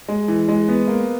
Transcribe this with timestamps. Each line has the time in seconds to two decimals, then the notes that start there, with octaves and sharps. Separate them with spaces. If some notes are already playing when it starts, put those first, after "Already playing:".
0.08 G#3
0.28 E3
0.48 G#3
0.69 B3
0.88 A#3